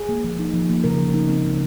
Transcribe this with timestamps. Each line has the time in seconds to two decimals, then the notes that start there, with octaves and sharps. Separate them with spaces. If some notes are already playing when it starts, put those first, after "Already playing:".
Already playing: G#4
0.09 A#3
0.24 F3
0.39 D#4
0.54 F3
0.70 A#3
0.84 C#3 A#4
0.99 F3
1.14 D#4
1.29 C4
1.45 C#3